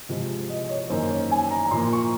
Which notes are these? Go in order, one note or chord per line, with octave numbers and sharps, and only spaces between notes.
C3 F3 G#3
D#5
D#5
C#5
F#2 D#3 A#3 C5
C#5
G#5
A#5
A#5
A#2 F3 A#3 C6
C#6